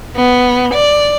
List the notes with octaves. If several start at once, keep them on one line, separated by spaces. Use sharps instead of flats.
B3
D5